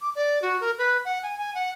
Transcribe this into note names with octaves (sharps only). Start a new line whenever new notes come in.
D6
D5
F#4
A#4
B4
F#5
G#5
G#5
F#5